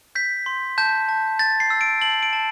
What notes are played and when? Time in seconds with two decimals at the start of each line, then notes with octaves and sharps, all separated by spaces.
0.15 G6 B6
0.46 C6
0.78 A5 G6
1.09 A5
1.39 G6 A6
1.60 C7
1.70 E6
1.81 D7
2.02 A5 F#7
2.23 D7
2.33 A5